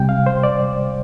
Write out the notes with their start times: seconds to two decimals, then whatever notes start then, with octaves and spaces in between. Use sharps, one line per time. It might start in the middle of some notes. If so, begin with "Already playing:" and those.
Already playing: C2 C3 G3 G5
0.09 F5
0.26 C5
0.43 D5